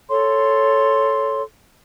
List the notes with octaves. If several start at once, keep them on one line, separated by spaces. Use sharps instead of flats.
A4 C#5 C6